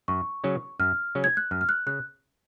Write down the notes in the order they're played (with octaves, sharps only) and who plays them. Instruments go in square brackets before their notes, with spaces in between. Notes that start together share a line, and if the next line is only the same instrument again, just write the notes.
[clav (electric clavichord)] F#2 [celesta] C#6
[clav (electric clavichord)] C#3 F#3 C#4
[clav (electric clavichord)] F#2 [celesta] F6
[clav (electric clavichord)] C#3 F#3 C#4
[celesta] G#6
F#6
[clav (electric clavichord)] F#2 [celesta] F6
[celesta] F6
F#6
[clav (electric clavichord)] C#3 [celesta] F#6